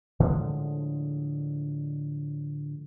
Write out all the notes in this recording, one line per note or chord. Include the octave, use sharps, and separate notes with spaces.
A2 D3 F3 G#3